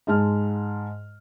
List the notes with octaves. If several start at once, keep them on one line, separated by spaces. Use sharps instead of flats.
G#2 G#3 A5 F6